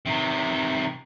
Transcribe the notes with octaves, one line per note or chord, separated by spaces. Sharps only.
C3 D#3